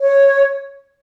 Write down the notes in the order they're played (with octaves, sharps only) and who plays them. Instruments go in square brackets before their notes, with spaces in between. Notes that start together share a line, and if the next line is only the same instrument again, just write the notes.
[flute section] C#5